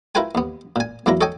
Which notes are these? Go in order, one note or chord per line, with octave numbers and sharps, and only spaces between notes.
E4 F4 A#4 B4 G5 G#5
D#2 B3
A#2 G#5
E2 F#3 A#3 E4 A#5
A4 C#5 D#5 G5 G#5